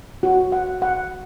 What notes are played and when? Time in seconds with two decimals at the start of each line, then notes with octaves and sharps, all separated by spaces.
0.23 F#4
0.52 F#5
0.82 F#5